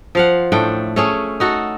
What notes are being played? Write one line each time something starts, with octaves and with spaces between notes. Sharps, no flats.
F3 F5 F#5
A2 A3 D4 G5
A3 C#4 G#4
D#4 F#4 A4